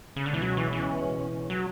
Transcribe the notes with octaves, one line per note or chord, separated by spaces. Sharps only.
C#3
C#2 B2 D3 G#3 C#4
E3
F#3
E3
E3
F#3